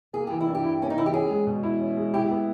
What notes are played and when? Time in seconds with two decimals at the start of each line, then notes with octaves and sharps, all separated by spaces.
0.13 A#3 G#4
0.27 E3 G4
0.41 E4
0.47 G2
0.55 G4
0.64 E4
0.80 A#3 C#4
0.90 D#4
0.97 E3 E4
1.06 G4
1.14 C#4 G#4
1.30 G#3
1.47 B2
1.63 E4
1.81 C#4
1.97 G#3
2.14 E4 G4
2.31 B3